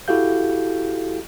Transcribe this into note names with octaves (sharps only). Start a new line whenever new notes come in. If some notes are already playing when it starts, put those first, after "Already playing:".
E4 F#4 G4 A4 F5 G6